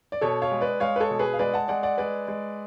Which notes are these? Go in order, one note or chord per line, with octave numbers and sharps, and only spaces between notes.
D5
B2 A4 C#5
C#5 F5
G#3
B4 D5
G#3 C#5 F5
B4
A4 C#5
B2
G#4 B4
F5
G#3 B4 D5
F#5 A5
G#3 D5 F#5
D5 F#5
G#3 B4 D5
G#3